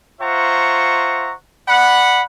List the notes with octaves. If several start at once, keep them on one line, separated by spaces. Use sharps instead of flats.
F4 C5 E5 F#5 A#5 C#6
D5 F#5 B5